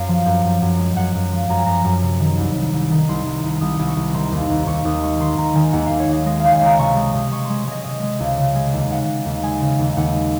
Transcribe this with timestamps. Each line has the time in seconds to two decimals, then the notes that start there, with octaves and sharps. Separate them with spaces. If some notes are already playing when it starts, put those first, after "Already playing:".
Already playing: F#2 F5
0.08 F3
0.26 F#2
0.44 F#2
0.62 F#2
0.79 G#3
0.96 F#2 F#5
1.15 F#2
1.32 F3
1.49 F#2 A#5
1.58 G#5
1.66 F#2 A#5
1.85 F#2
2.02 C3
2.20 D#3
2.38 C2
2.56 C2
2.72 C2
2.91 D#3
3.09 C2 C6
3.26 C2
3.44 C2
3.61 C2 D#6
3.79 C2
3.88 C#6
3.97 C2
4.14 D#3 C6
4.32 D#2
4.50 D#2
4.66 D#2 C#6
4.85 D#2 D#6
5.02 G#3 C#6
5.20 D#3 C6
5.37 D#2 A#5
5.55 D#3 G#5
5.72 D#2 F#5
5.86 D#2 F5
6.00 C#5
6.08 D#2 D#5
6.26 G#3 D#5
6.40 C#2 F5
6.52 G#5
6.61 C#2 A#5
6.79 C3 C#6
6.96 G#3 D#6
7.14 C3 D#6
7.32 G#3 C#6
7.45 C6
7.50 G#3
7.58 C#6
7.67 G#3 D#5
7.84 C3 D#5
8.02 G#3
8.20 C#2
8.38 C#3
8.55 G#3
8.73 D#2
8.90 C#3 F#5
9.08 C#3
9.25 D#2
9.43 G#3 G#5
9.61 C#3
9.79 D#2
9.97 D#2 F#5
10.14 G#3